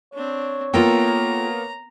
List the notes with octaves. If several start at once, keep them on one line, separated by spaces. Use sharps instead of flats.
C4 D4 C#5
A#3 B3 F4 A4 A#4 G5 A#5